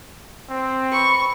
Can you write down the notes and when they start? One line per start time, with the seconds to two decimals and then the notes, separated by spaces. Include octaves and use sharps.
0.50 C4
0.92 B4 C#6